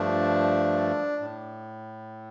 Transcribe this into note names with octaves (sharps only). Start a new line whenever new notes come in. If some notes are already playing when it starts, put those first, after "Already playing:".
Already playing: G2 F3 A3 D4
A2